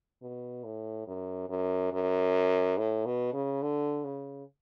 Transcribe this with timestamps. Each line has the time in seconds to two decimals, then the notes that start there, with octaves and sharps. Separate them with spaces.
0.22 B2
0.64 A2
1.07 F#2
1.49 F#2
1.92 F#2
2.78 A2
3.06 B2
3.33 C#3
3.63 D3
4.05 C#3